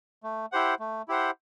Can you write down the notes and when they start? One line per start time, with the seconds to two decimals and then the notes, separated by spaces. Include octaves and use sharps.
0.23 A3
0.52 E4 G4 C5 F#5
0.79 A3
1.08 E4 G4 C5 F#5